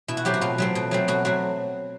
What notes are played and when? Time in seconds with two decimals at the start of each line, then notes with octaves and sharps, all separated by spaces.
0.08 B2 E4
0.17 F#4
0.25 F#3 A3 C4 G4
0.34 F#4
0.41 B2 F4
0.58 F#3 A3 C4
0.75 B2
0.91 F#3 A3 C4
1.08 B2 F#4
1.25 F#3 A3 C4 F#4